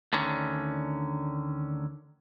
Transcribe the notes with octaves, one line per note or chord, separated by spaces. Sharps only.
D2 D3 D#3 C#4